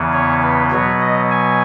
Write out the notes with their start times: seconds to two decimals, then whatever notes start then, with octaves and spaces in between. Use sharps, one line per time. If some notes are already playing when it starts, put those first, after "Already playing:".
Already playing: E2 C#3 E3 B3
0.13 C#5
0.42 B4
0.71 B2 F#3 B3 C#5
1.01 D#5
1.31 G#5